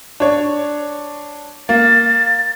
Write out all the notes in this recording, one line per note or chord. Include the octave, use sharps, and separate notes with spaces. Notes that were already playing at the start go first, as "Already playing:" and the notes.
D4 C#5
A#3 A6